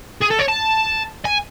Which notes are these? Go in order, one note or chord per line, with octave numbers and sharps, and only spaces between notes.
G#4
A4
C#5
A5
G#5